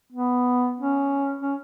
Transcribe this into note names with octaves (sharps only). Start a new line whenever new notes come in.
B3
C#4
C#4